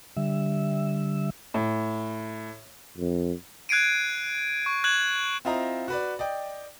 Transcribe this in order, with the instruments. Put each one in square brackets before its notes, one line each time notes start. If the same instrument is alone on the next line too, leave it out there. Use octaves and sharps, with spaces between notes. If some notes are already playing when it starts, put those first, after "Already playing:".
[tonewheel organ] D3 G3 E5
[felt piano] A2
[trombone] F2
[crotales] F#6 G#6 C7 D7 D#7
C#6
F#6 G#6 E7 F#7
[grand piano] C4 E4 F4 D#5 A#5
F#4 B4 D5
D5 D#5 G5